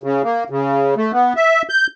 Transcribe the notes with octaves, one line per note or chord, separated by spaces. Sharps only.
C#3
A#3
C#3
A3
B3
E5
G6